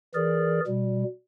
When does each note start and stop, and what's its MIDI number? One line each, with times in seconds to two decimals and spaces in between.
0.14 0.60 52
0.14 0.60 68
0.14 0.60 70
0.14 0.60 74
0.67 1.04 47
0.67 1.04 55